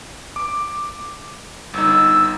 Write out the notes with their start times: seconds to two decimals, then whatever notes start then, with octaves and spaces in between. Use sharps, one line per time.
0.36 D6
1.74 G1 D#4 E6